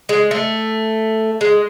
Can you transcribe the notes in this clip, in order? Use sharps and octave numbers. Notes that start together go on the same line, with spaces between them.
G#3
A3
G#3